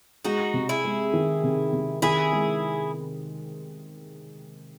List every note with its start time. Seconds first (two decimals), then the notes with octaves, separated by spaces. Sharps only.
0.25 G#3 D#4 F#4
0.54 C3
0.69 E4 G#4
0.84 G#3
1.13 D#3
1.43 C3
1.73 C3
2.02 D#3 E4 G#4
2.32 G#3